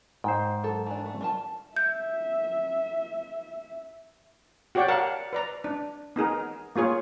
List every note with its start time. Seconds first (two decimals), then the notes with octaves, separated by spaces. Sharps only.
0.24 G#2 C5 G5
0.63 F#3 A4
0.86 E3 D4
1.06 A3
1.21 G3 F4 A5
1.77 E5 G6
4.75 F#4 G4 C#5 D5 F#5 G5
4.88 A#4 D5 F5 F#5 A5
5.33 B4 D5 A#5
5.64 D4
6.16 B3 D#4 G#4 A#4
6.76 A#3 F4 G#4 C#5